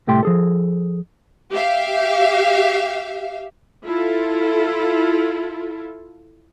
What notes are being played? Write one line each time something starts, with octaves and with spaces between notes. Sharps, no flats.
C2 A2 A3 G4 G5 C6
F3 G#4 A4
G4 E5 F5
E4 F4 A4